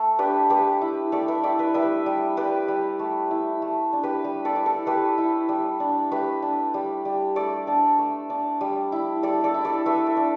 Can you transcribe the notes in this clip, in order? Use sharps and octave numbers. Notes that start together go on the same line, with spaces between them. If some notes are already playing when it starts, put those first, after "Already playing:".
Already playing: A3 A4
D4 G4 B4
A3 G4 B4
E4
A3 A4 D5
B4 E5
E4 D5 G5
B4 E5
G3 B4 E5
G3
G3 G4 B4
G3
A3
E4
A3
D4
G4 B4
G3
A4 D5
E4
A4
A3 G4 B4
E4
G3
D4
A3 G4 B4
D4
G3
G3
A3 A4 D5
D4 A4
A3
D4
G3
E4
G3 A4 D5
A4 D5
E4
A4 D5
A3 B4 E5
A4
D4